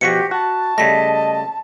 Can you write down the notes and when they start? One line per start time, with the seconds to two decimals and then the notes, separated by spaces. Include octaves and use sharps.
0.01 B2 F3 F#4 G4 A#6 B6 C#7
0.31 F#4 A5
0.78 C#3 G3 A3 D#5 A#6 B6